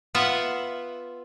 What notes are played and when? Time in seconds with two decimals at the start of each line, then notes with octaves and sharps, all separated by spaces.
0.15 B3 F4 E5 F#5